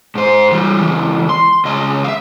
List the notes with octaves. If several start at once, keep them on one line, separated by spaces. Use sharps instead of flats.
G#2 C5
E3 G3
C#2 E3
C6
C#2 D#5
E5 F5